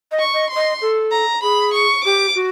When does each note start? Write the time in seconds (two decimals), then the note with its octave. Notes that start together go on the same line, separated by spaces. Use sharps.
0.12 D#5
0.19 C#6
0.34 D#5
0.50 C6
0.56 D#5
0.81 A4
1.11 A#5
1.42 G#4 B5
1.74 C#6
2.04 G4 D6
2.35 F#4